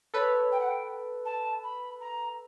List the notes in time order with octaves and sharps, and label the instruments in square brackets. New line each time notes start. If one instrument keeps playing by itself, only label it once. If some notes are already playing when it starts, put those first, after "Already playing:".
[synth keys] A4 B4 [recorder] C#5
[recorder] G5
F#5
G5
A5
B5
A#5